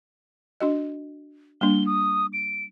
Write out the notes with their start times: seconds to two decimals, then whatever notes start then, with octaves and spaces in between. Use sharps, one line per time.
0.60 D4 F#4 D#5
1.61 G3 A#3 D4 G7
1.86 D#6
2.33 D7